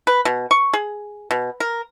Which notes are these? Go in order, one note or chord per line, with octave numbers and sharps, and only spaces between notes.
B4
B2
C#6
G#4
B2
A#4